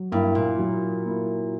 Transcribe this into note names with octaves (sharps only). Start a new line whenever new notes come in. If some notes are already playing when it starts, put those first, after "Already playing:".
Already playing: F#3
G2 A#3 E4
A#2
F#3
A#3 E4